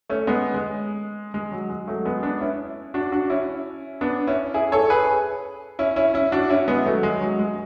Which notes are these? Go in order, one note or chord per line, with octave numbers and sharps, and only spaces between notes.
A3 C#4
G#3 B3
G#3
G#3
F#3
G#3
F#3 A3
G#3 B3
B3 D4
C#4 E4
D4 F#4
D4 F#4
C#4 E4
B3 D4
C#4 E4
E4 G#4
A4 C#5
G#4 B4
C#4 E4
C#4 E4
C#4 E4
D4 F#4
C#4 E4
G#3 B3
F#3 A3
G#3
F#3
G#3